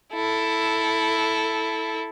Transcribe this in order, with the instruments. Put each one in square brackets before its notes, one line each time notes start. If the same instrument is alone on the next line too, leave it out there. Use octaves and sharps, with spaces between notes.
[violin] E4 A4